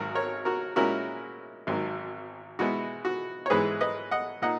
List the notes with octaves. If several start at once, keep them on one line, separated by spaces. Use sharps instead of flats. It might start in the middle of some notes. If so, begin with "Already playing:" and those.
Already playing: G#1 G#2 F#3 F#4 A#4
A#4 C#5
F#4 A#4
A#2 G#3 C#4 E4 F#4 A#4
G#1 G#2 D#3 F#3
B2 G#3 B3 E4 F#4
F#4
C#5
G#2 E3 G#3 B3 E4 G#4 B4
B4 D#5
D#5 F#5
A#2 A#3 D#4 D#5 F#5